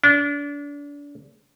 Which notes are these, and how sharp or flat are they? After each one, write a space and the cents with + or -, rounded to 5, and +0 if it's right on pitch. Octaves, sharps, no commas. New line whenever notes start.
D4 -30